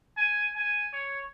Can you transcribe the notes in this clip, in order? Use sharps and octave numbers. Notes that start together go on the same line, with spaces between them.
G#5
G#5
C#5